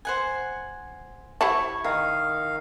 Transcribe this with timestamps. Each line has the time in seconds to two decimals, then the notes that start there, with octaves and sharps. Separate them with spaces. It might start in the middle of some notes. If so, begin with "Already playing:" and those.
0.05 C5 F#5 G#5
1.41 E4 G4 F#5 A5 C#6
1.84 D#3 F5